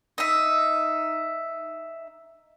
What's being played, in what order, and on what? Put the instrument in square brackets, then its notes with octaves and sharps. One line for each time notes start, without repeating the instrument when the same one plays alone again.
[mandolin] D#4 E5